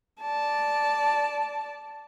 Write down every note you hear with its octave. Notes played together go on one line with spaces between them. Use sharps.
D5 A5